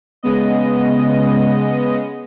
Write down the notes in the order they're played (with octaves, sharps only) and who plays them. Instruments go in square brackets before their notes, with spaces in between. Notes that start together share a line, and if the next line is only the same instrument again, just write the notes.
[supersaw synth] C#3 G#3 B3 D#5